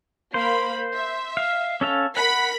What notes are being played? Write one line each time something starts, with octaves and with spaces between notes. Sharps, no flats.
A#3 C5 B5
E5
F5
C#4 A4 F5
A#4 F#5 B5 B6